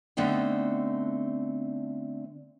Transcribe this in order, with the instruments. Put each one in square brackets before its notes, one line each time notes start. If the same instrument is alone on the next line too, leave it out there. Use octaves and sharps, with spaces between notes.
[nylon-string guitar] D3 A3 B3 C4 D#4